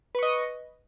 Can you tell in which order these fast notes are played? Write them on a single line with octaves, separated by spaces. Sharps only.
B4 C#6 D#5